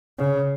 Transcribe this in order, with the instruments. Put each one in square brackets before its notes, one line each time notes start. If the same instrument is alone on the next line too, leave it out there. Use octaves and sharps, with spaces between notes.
[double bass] C#3